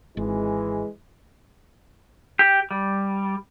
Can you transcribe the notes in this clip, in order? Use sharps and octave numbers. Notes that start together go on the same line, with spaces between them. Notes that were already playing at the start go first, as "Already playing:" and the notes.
G#1 E3 G#3
G4
G3